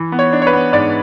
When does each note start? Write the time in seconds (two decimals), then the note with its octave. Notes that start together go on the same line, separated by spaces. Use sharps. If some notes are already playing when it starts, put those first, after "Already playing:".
Already playing: E3
0.12 B3
0.19 C#5
0.33 D4
0.42 C#5
0.47 B4
0.53 B3
0.73 G#2 D5